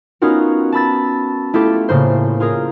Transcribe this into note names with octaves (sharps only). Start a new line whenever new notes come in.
B3 C#4 D#4 F4 F#4 A#4
A5 B5 E6 A6
A3 E4 F4 G4 A4
A2 C#3 A#3 C5
F4 G#4 A#4